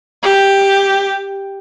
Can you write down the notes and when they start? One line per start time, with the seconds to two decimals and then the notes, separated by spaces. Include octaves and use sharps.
0.23 G4